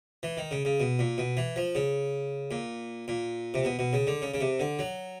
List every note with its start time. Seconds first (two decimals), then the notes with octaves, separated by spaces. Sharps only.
0.23 E3
0.37 D#3
0.51 C#3
0.65 C#3
0.80 B2
0.99 A#2
1.18 B2
1.37 E3
1.56 F3
1.75 C#3
2.51 A#2
3.08 A#2
3.54 C3
3.65 B2
3.79 B2
3.93 C#3
4.07 D3
4.22 C#3
4.34 C#3
4.41 C3
4.60 D3
4.79 F#3